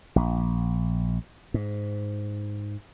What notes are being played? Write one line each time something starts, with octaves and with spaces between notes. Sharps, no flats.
A#1
G#2